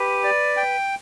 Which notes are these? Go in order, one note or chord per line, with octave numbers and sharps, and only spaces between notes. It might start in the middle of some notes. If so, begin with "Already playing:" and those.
Already playing: G4 B4
D5
G5